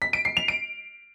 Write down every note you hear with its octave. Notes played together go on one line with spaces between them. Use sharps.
B6
D7
C7
F7
D7